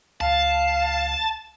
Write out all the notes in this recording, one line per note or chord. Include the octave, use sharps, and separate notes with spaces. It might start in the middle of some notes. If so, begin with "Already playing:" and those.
C#2 F5 A5